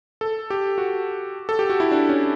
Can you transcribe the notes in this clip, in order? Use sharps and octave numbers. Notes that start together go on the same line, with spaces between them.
A4
G4
F#4
A4
G4
F#4
E4
D4
C#4